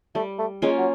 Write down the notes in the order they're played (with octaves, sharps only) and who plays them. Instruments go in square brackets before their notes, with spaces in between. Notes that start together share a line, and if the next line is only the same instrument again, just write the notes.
[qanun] G3 [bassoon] A3
[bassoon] A3
[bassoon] G#3 [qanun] A#3 C#4 F4
[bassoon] F#3